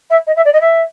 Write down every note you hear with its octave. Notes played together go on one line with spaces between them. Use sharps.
E5
D#5
E5
D5
D#5
E5